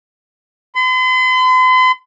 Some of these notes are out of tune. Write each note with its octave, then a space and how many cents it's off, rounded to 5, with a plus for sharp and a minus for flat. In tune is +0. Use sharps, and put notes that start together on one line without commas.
C6 -45